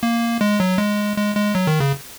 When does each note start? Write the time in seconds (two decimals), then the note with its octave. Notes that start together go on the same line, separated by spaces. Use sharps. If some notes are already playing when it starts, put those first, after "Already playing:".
0.03 A#3
0.41 G#3
0.60 F#3
0.79 G#3
1.17 G#3
1.36 G#3
1.55 F#3
1.67 D#3
1.80 C#3